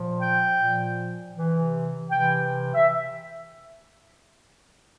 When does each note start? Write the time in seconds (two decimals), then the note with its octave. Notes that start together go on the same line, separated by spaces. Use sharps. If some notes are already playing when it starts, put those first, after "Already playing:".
Already playing: A#2 F3
0.19 G5
0.57 A#2 F3
1.34 C3 E3
2.10 C3 E3 G5
2.74 E5